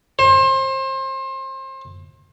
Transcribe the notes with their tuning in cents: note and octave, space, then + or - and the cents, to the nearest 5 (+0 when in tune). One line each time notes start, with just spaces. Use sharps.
C5 +30